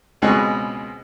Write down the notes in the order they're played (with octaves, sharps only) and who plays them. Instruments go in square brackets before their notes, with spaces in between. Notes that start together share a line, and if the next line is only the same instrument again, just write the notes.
[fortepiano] C#2 B2 G#3 C4 D#5 C#6